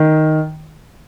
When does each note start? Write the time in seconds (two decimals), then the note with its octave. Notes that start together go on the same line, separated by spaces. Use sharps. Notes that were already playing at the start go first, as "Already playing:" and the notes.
Already playing: D#3